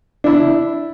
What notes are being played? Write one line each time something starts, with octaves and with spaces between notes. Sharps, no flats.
D4 E4